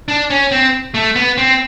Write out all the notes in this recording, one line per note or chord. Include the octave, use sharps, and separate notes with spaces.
D4
C#4
C4
A3
B3
C4